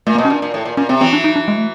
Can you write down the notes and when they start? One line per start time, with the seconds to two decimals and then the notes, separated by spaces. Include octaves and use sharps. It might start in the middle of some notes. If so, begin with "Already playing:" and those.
0.07 A#2 A3
0.15 A#3
0.18 B2
0.25 C#4
0.30 A#2 D4
0.42 A#2
0.54 A2
0.65 A#2
0.77 A#2 C#4
0.89 C3 C4
1.01 E3 F#3 C4
1.13 D4
1.24 D#4
1.36 D4
1.48 G#3
1.57 A3